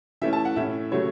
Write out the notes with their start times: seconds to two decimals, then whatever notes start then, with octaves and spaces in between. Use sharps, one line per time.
0.21 E3 A3 C#4 E5
0.33 A5
0.45 F#5
0.56 A2 A3 C#4 E5
0.91 C#3 F#3 A3 C#5